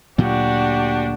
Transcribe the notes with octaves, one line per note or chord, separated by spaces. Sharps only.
D2 A#2 F#3 D4 F#4 G4